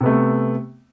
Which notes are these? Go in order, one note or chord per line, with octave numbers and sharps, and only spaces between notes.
C3 A3 B3